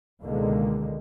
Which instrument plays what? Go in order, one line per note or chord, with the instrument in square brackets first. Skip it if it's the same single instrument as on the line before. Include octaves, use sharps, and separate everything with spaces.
[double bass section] C#2 B2 D3 D#3 G#3 A#3